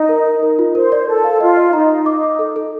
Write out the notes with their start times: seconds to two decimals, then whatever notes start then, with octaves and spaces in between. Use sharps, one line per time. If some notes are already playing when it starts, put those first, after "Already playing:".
Already playing: D#4
0.09 A#4
0.25 A#4
0.43 A#4
0.59 F4
0.75 A#4 C5
0.92 D5
1.08 A4 A#4
1.24 F5
1.40 F4 D#5
1.57 D#5
1.73 D#4 A#5
1.90 D#5
2.06 D6
2.23 D6
2.39 A4
2.56 A4